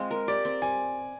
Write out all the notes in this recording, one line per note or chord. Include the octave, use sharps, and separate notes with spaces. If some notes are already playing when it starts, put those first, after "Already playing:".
Already playing: G#3 C4 F4
A#4
G4 D5
C4
G3 G#5